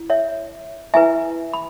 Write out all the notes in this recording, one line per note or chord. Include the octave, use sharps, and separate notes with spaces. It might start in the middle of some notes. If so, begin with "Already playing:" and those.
Already playing: E4
C#5 E5
E4 B4 E5 G#5
B5